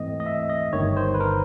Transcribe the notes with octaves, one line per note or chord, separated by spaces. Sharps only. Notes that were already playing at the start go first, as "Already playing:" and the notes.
Already playing: G#2 E3 A3 C4 D#5
D#5
E5
D#5
G1 G2 D#3 C#5
C5
B4
A#4